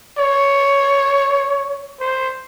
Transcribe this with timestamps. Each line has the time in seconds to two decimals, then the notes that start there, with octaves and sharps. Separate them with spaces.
0.18 C#5
2.00 C5